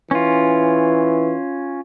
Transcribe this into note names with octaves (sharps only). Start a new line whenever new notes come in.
E3 C#4 F4